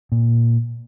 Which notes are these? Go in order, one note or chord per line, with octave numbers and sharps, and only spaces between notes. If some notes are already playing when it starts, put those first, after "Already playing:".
A#2